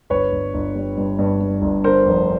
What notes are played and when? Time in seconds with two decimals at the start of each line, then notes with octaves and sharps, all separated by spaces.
0.10 G1 B4 C#5
0.32 G1
0.54 G1
0.75 G3
0.97 G2
1.19 G2
1.41 G2
1.62 G1
1.84 D3 A#4 C5
2.06 F1